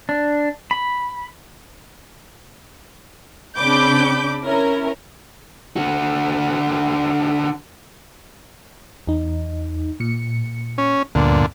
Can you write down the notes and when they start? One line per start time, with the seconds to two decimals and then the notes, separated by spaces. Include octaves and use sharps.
0.09 D4
0.71 B5
3.58 C#3 C4 D4 B5 D6 G6
4.46 C#4 E4 A#4
5.76 D3 F#4
9.07 E2 D#4
10.00 A#2 C#7
10.78 C#4
11.15 D2 G2 A#2 D3 B3